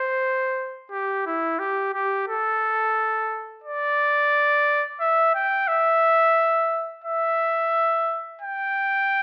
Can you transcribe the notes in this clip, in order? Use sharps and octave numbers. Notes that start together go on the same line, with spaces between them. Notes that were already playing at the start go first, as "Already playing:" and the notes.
Already playing: C5
G4
E4
G4
G4
A4
D5
E5
G5
E5
E5
G5